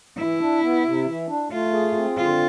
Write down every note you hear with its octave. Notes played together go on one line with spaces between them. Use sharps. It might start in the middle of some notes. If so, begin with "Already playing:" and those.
E3 E4
D4
B3
C3
E3
D4
A3 F4
G#4
C4
D3 F4